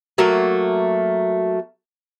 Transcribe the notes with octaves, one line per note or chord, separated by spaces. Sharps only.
F#3 A3 A#3